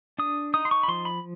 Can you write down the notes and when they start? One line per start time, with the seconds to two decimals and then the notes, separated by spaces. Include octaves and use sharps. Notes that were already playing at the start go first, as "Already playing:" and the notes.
0.19 D4 D#6
0.54 D#4 D#6
0.65 C6
0.71 C#6
0.83 B5
0.88 F3 C6
1.05 B5